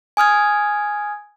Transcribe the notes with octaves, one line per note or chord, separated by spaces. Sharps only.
G#5 D#6 F6 G#6